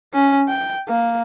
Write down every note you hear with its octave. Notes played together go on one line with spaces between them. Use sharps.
C#4
G5
A#3